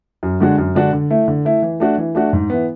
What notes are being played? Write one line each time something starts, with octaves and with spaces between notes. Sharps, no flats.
F#2
D3 G#3 D4 F#4
F#2
D3 G#3 D4 F#4
D3
A3 E4
D3
A3 E4
E3
A3 D4 F#4
E3
A3 D4 F#4
G#2
E3 B3